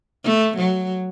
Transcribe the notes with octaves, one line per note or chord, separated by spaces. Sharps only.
A3
F#3